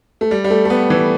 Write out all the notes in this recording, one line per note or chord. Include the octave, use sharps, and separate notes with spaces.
A3
G3
G3
A3
A3
B3
E3